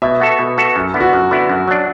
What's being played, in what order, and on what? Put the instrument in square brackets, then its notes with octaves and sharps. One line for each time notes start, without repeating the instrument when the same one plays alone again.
[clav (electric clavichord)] B2 [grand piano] E5
[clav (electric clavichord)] B3 F#4 A4
B2
B3 F#4 A4
F#2
D3 B3 E4
[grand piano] F#4
[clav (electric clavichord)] F#2
D3 B3 E4
F#2
F#3 D4